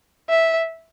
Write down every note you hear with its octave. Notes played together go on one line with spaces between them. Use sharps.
E5